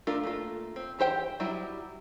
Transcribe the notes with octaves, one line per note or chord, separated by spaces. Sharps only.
A3 D4 F4 A#4
A3 A#3 F4
C4
E3 G4 C5 G5
F#3 G3 E4